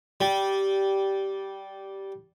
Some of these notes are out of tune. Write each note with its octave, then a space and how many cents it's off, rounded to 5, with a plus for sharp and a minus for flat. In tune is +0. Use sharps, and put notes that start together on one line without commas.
G3 -10